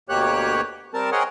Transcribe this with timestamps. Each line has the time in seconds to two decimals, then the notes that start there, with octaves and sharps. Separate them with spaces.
0.09 D2 B2 A#3 G4 C#5 F#6
0.94 G3 C4 A#4 A5
1.12 C4 G#4 A#4 C#5 D#5 F#5